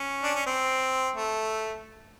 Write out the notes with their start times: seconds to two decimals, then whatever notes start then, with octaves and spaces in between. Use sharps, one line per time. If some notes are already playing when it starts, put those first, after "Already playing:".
Already playing: C#4
0.23 D4
0.35 C#4
0.46 C4
1.15 A3